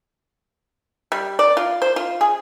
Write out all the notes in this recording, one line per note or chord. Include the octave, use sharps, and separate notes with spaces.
G3
D5
F4
C5
F4
G#4